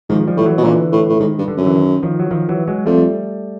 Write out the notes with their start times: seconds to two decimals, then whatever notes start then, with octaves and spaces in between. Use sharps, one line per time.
0.09 G#2 D#3 F3
0.27 F3 G3
0.37 A2
0.41 F3
0.46 E3 F#3
0.58 B2
0.64 A#2 D3 E3
0.92 A2
1.09 A2
1.20 G#2 D#3
1.38 G2
1.48 D3
1.57 F#2
1.67 E3
1.76 D#3
2.03 D#3 F3
2.19 F#3
2.31 D#3 F3
2.49 E3 F#3
2.68 F#3 G#3
2.86 F2 G3 A3